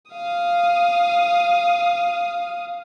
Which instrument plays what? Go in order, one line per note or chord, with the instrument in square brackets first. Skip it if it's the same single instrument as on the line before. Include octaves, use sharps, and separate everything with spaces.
[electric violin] F5 D#6